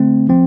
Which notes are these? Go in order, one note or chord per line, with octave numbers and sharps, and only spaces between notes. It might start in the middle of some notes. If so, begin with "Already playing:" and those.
Already playing: D3 A3 C4
F3 C4